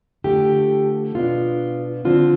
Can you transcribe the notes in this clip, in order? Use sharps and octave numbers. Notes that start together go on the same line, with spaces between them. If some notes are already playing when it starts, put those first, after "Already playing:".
D3 F3 A3 G4
B2 B3 D4 F4
D3 F3 C4 F4